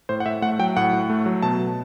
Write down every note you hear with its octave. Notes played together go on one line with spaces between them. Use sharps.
A2 C5
F#5
A2 E5
A3 F#5
F#3 G5
A2 F#5
A2
A3
F#3
B2 A5
B2